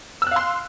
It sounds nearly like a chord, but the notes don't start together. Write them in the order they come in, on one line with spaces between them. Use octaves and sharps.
E6 F#6 F5 C6